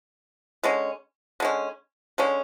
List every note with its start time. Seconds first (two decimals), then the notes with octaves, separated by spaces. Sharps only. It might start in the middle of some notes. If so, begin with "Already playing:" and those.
0.63 D3 G#3 C#4
1.40 D3 G#3 C#4
2.18 D3 G#3 C#4